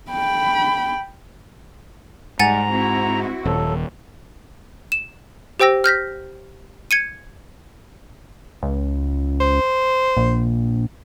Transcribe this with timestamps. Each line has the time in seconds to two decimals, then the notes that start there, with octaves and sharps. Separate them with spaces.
0.12 G5 B5
2.39 G#2 G3 F#5 G#5 A#5 A6
2.69 C4 E4 F#4
3.45 D#1 F#3 A4
4.92 E7
5.60 G4 C5 G5 E6 A#6
5.84 F6 G6 A#6 B6
6.91 G#6 C#7 D#7
8.63 C#2
9.41 C5
10.17 A#1